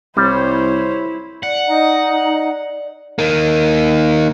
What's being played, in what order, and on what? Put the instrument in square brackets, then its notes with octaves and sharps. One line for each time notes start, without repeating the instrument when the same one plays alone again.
[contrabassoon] C2 [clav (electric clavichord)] G3 [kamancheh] E4 [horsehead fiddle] C5 C#5
[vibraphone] D5 [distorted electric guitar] F#5
[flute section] D#4
[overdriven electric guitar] D#3 A#3